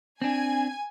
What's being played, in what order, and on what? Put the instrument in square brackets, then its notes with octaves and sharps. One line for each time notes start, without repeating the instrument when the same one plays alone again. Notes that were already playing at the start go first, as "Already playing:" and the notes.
[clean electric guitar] C4 D4 [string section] G#5